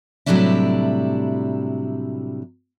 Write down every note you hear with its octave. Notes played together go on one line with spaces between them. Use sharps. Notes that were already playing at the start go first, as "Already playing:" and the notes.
A2 C3 F#3 G3 D4 E4